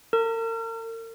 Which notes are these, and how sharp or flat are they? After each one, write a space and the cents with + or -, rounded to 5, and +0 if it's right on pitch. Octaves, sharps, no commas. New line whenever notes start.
A#4 -40